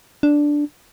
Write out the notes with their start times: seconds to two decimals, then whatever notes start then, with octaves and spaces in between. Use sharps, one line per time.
0.23 D4